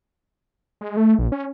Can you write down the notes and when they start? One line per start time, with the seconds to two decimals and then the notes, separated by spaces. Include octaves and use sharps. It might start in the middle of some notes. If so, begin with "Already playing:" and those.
0.81 G#3
0.97 A3
1.19 A#1
1.32 C#4